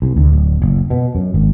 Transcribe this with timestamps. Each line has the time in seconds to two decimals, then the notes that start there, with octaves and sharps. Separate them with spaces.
0.02 C2
0.16 D2
0.33 D1
0.62 F#1
0.90 B2
1.15 F#2
1.34 G#1